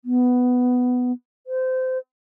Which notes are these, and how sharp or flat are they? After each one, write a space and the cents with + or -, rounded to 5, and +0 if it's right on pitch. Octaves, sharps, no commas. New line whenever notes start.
B3 +10
C5 -25